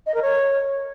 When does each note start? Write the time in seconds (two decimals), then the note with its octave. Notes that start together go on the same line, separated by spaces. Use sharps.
0.06 D#5
0.14 A#4
0.22 C#5